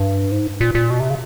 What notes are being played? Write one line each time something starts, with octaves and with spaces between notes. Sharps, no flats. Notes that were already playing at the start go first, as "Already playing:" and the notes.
Already playing: G2
G#2
A#2
A#2
B2
C3
C#3